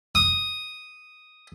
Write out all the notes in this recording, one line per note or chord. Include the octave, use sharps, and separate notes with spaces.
D#6